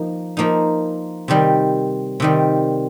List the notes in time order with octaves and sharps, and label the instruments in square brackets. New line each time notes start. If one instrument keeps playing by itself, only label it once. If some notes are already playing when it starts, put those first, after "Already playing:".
Already playing: [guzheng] F3 A#3 D#4
F3 A#3 D#4
C3 D#3 G3
C3 D#3 G3